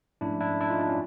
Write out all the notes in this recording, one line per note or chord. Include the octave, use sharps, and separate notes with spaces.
G#2 F3 A3 C#4 D4 E4
D4 E4
D4 E4
D#4 F4
D4
C#4